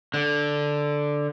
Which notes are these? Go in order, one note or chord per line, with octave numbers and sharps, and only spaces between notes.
D3